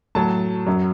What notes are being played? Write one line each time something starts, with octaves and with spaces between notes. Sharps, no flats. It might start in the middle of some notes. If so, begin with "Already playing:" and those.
A2 F#3 A5
F#2 F#3